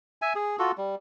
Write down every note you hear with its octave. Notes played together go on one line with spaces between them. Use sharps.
E5 G#5
G#4
F4 F#4 A4
G3